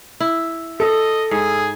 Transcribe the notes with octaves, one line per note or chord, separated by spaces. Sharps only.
E4
A4 D#5
G#2 G#4